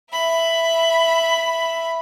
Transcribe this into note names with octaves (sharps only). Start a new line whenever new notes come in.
E5 B5